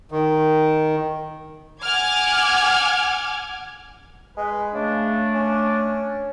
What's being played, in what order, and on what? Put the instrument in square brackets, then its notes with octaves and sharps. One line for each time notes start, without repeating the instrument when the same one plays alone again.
[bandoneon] D#3
[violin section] F#5 G#5 D6 F6 G#6
[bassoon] G#3 [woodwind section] B4
[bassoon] C#3 [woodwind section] A3 D4
[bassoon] C#4